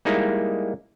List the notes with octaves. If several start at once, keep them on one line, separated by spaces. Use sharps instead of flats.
G3 G#3 A#3 D#4 E4